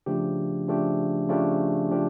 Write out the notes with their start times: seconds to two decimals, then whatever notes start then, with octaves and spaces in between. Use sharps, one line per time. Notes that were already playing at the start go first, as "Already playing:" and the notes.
0.06 C#3 F3 A3 D4 G4
0.68 C#3 F3 A3 D4 G4
1.29 C#3 F3 A3 D4 G4
1.91 C#3 F3 A3 D4 G4